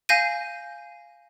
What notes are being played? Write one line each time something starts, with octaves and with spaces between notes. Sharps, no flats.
F5 G#5 G6 A#6 D#7